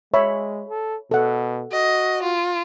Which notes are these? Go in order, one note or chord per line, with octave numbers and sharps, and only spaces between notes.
G#3 C#5 E5 B5
A4
B2 A4 F#5
F#4 D#5
F4